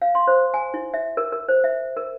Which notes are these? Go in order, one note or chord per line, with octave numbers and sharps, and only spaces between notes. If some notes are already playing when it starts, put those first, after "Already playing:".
F5
C6
C5
G#5
E4
E5
A#4
A#4
C5
E5
A#4